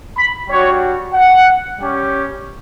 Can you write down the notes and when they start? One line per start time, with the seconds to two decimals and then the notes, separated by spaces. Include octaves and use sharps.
0.17 B5
0.49 G3 D4 F#4 C#5
1.13 F#5
1.77 G3 C#4 G4